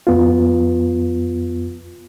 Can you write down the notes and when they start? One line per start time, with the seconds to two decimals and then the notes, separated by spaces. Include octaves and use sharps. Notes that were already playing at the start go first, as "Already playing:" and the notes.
0.07 F2 B3 F4